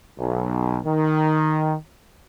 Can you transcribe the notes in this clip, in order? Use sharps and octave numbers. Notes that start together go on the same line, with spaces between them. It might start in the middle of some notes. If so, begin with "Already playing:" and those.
B1
D#3